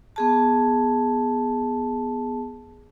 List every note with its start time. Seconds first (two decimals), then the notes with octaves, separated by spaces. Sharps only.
0.16 B3 G#4 A5